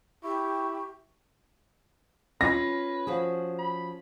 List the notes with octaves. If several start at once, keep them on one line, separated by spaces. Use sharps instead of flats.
E4 G4 C#6
C#4 F4 B4 A#6
F3 F#4 G#4
B5